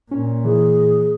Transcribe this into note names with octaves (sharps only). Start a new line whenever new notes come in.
A#2 C#4
E3 G#4